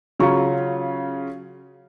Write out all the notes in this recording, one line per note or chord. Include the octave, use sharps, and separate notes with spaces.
C#3 F#3 C#4 F4 A#5 C#6